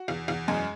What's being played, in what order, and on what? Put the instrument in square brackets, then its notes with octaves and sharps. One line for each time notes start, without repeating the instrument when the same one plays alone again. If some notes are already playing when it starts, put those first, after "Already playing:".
Already playing: [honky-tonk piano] F#4
E2
E2
F#2 G#3 G#4